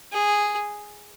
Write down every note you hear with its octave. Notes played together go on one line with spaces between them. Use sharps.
G#4